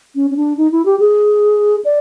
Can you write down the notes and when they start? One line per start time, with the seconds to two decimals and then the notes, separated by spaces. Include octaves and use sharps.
0.15 C#4
0.30 C#4
0.37 D4
0.57 D#4
0.72 E4
0.86 G4
1.00 G#4
1.85 D5